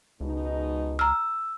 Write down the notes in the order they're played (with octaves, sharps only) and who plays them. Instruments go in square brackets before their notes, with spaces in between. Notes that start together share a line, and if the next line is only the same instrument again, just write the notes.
[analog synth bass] C#2 [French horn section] G#2 B2 D#4
[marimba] A#5 F6 [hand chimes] E6